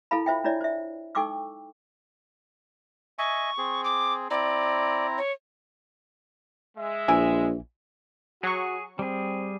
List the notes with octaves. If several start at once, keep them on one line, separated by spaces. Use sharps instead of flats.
E4 A4 A#4 F5 A5 B5
F4 C5 E5 G5
D4 E4 C#5 D5 E5
C5 E5
D#4 A4 G5 C#6 D6 E6
D#5 E5 G#5 C#6
C4 G#4
D6
C4 E4 D5 A#5
C#5
G#3 E5
A#1 E3 E4 G#5
F#3 F#4 G#4 C#6
G3 C4 G#4